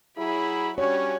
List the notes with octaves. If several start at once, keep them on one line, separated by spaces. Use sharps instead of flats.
F#3 E4 G#4 B5
G3 C#4 D4 F#4 C#5